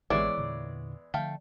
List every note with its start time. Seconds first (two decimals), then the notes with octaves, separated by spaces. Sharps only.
0.10 A1 E3 G#3 B3 E4 C#5 D5
0.37 E2 A#2 D3
1.14 D3 F3 A3 F5 G5